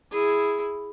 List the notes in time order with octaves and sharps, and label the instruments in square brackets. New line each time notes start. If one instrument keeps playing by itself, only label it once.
[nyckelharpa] E4 G#4